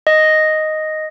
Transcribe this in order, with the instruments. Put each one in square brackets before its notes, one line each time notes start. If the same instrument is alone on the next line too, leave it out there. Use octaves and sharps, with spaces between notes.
[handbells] D#5